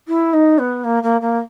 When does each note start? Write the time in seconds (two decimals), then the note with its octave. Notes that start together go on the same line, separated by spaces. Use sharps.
0.08 E4
0.33 D#4
0.58 B3
0.84 A#3
1.02 A#3
1.21 A#3